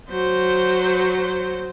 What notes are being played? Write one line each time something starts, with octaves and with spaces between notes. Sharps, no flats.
F#3 C5